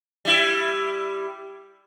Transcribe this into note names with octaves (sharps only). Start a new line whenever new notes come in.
G3 E4